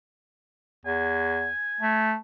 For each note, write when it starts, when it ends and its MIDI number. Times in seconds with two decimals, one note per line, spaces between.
0.86 1.50 40
0.86 2.11 80
1.81 2.16 57